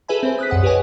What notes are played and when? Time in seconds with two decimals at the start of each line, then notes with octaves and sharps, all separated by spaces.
0.08 G#4 A4 B4 E5 G#5 B5
0.23 C4 C5
0.39 D#6 F#6 B6
0.50 C2 F#2 F#5 D#6
0.63 G4 G#4 B4 C#5 D#5 G#5